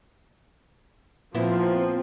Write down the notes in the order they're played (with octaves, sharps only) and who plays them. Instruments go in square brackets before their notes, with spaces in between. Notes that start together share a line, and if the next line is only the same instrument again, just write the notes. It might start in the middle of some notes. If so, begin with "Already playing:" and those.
[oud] A#2 B3 E4 [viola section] F3 C4